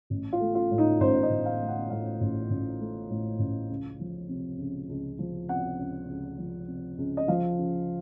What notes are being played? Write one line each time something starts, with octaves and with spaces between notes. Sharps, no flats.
A1
F4
A3
F4
A2
D#4
A1 C5
D#5
A1
F5
A3
F#5
A2 F5
A1
A1
A3
A2
A1
C#2
F3
C3
C#2
C#2
F3
C3 F#5
C#2
C#2
F3
C3
C#2
D#5
F3 F5
C#3